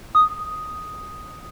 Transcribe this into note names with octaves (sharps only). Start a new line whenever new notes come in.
D#6